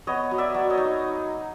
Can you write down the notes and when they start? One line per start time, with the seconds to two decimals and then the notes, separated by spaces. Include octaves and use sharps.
0.07 B3 C#5 D#5
0.31 F#3
0.38 D5 E5
0.54 F#3
0.70 C#5 D#5
0.78 D#4